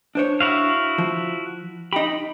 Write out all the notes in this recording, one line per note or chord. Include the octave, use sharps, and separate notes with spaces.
D4 C5 C#5
E4 F#4 F5
F3
D#4 G4 B5